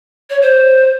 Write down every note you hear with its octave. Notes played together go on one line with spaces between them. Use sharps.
C#5
C5